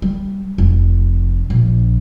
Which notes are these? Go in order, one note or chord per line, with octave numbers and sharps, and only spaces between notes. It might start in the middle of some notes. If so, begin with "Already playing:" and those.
G3
F1
A#1